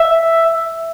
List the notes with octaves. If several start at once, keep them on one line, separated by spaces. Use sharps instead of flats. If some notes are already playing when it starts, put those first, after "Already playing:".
Already playing: E5